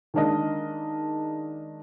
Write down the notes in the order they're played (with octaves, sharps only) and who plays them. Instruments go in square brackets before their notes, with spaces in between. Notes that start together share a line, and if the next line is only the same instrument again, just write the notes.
[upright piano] D#3 G#3 A#3 D4 A#4 D#5